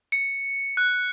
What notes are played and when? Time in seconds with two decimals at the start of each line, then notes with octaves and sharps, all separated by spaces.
0.12 C#7
0.77 F#6